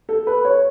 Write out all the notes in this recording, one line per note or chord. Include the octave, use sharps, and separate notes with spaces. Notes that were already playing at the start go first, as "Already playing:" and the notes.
A4
B4
C#5